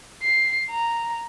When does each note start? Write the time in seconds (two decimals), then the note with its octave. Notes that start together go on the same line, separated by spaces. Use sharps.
0.22 C7
0.70 A#5